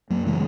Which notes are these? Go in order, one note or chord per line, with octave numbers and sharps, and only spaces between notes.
F#2 F#3 A#3
C#3 E3 G#3